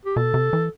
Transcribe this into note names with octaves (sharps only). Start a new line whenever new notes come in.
G4
B2 A4
C3
E3